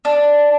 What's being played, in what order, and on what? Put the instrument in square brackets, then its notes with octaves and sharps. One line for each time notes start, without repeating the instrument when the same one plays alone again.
[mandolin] D4